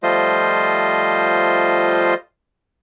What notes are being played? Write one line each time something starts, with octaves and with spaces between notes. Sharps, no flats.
F3 G3 A3 F4 C5 D#5